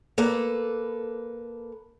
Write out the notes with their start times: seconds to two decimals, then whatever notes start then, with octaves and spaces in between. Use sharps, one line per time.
0.18 A#3 A4 B4